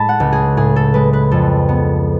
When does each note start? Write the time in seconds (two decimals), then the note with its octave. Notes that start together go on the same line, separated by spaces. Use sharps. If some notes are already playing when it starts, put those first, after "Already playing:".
Already playing: A2 G#3 A5 B5
0.09 F#5
0.20 C#2
0.32 G#4
0.57 A2 G#4
0.76 A4
0.94 G#3 B4
1.13 B4
1.31 F2 A4
1.69 B3